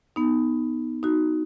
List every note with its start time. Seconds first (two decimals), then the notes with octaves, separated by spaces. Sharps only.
0.16 B3 D#4
1.03 D#4 F#4